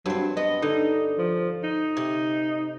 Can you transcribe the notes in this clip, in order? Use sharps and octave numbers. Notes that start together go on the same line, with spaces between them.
G2 F#3 C4
B3 D#5
D3 D#4
F3
D#4
C3